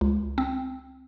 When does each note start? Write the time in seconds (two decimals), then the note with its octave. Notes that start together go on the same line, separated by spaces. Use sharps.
0.01 C#2
0.38 C4